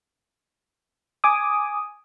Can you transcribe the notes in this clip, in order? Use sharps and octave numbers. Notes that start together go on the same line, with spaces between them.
G#5 D6 D#6